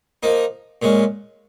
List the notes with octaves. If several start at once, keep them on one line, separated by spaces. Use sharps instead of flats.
F3 A#3 D#4
A#2 G#3 C#4